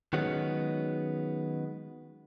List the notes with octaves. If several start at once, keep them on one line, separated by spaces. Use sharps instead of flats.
D#3 F#3 G#3 B3 C#4